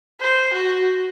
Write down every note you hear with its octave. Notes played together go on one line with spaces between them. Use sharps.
C5
F#4